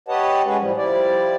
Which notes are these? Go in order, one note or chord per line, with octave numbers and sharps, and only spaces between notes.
G4 B4 C#5 D#5 F#5 A5
G#3 C#4 F#4 G#4 B4
A2 F3 G3
F3 G3 E4 D5